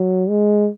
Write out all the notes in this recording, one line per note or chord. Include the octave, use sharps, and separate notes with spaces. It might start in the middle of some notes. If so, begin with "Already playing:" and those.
Already playing: F#3
G#3